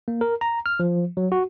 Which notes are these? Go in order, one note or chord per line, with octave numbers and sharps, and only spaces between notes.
A#3
A#4
A#5
F6
F3
F#3
F#4